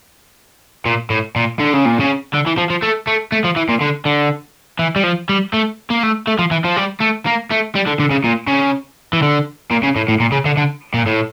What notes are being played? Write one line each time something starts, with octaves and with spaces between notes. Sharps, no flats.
A#2
A2
A#2
D3
C#3
A#2
C#3
D3
E3
F3
F3
A3
A3
A3
F3
E3
A#2
D3
D3
E3
G3
F3
G3
A3
A#3
A3
A3
F3
E3
F3
G3
A3
A#3
A3
G3
D3
D3
C#3
A#2
C#3
E3
D3
A#2
C#3
A2
A2
A#2
C#3
D3
D3
A#2
A2